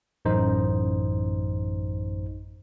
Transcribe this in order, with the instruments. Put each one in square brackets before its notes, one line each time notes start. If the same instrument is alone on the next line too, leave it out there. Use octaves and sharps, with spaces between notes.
[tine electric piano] A1 F#2 D#4 C5